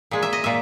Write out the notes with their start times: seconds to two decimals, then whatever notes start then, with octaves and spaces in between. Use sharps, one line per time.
0.11 A#2 G#3
0.22 E5
0.33 D#5
0.44 A#2 E5